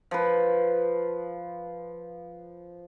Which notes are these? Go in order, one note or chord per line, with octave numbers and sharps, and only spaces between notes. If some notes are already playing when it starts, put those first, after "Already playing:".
F3 B4